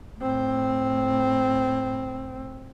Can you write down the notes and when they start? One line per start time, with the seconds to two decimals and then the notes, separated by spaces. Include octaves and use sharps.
0.19 A2 C4